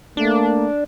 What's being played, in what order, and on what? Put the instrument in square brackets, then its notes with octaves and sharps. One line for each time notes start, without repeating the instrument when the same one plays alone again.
[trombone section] A3 A#3 [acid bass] D4